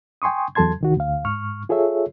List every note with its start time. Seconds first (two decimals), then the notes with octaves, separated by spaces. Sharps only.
0.22 G5 G#5 C6 C#6 D#6
0.55 E2 F#3 A4 A5 C6 G#6
0.81 C2 D#3 F#4
0.97 D2 F5
1.25 G#2 C#6 F6
1.69 F4 G#4 A4 C#5 E5